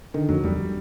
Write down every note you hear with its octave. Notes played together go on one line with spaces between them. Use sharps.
D3 D#3
F2 F#3
F2 G3